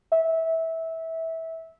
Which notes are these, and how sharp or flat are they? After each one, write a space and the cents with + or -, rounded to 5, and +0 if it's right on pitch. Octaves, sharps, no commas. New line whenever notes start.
E5 -20